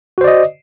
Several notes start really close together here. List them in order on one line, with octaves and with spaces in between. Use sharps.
F#4 C5 D5 D#5